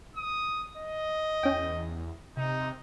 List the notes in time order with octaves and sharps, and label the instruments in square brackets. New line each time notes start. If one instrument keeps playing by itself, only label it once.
[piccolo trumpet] D#6
D#5
[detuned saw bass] E2 [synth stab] C#4 G5
[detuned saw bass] C3 [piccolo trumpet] D#4